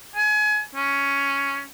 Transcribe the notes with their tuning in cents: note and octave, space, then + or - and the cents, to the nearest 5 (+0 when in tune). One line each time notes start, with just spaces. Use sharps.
G#5 +30
C#4 +5